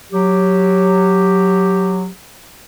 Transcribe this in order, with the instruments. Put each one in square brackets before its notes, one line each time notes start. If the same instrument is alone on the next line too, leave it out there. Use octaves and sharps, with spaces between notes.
[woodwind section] F#3 G4